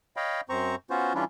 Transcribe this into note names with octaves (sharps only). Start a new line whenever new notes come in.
C#5 D#5 F5 G5 B5
F#2 C4 C5 A#5 C#6
B3 C#4 F4 F#4 C5
E3 G3 C#4 D4 E4 F4